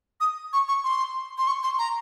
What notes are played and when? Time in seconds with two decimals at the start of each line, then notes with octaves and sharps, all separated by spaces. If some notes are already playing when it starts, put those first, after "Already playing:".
0.21 D#6
0.53 C#6
0.68 C#6
0.84 C6
1.38 C6
1.47 C#6
1.63 C6
1.79 A#5